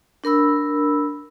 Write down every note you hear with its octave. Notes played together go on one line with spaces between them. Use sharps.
D4 A#4 B5 E6